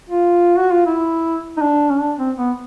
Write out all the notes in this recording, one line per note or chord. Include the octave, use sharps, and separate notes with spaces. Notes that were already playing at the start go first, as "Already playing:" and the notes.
F4
F#4
F4
E4
D#4
D4
C#4
D4
C4
B3